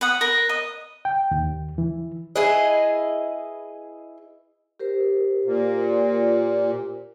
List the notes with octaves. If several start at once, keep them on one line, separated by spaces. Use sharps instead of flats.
B4 F#5 D#6
A#4 B4
D#5
G5
D#2
E3
E4 G#4 B4 D#5
G4 A#4 C5
A#2